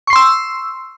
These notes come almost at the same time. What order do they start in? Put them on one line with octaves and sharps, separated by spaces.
C#6 C7 C6 E6